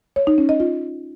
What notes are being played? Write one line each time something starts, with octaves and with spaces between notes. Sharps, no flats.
C#5
D#4
C#4
D#5
F4